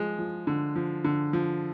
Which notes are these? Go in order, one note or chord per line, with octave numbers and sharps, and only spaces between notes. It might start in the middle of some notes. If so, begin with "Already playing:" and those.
Already playing: F3 G#3
F3
D3
F3
D3
F3